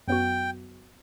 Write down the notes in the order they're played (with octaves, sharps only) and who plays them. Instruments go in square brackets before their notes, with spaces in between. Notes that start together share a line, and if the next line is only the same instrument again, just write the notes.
[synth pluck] F#2 F#3 B3 F#4 [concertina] G5